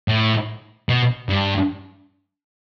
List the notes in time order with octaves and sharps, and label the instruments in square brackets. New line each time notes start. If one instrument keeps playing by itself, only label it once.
[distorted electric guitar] A2
B2
G2